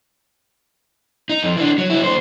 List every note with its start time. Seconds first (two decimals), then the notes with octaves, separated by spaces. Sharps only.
1.30 D#4
1.43 F2
1.56 E3 D4
1.78 F#3
1.90 F#3 E4
2.02 D#2 C5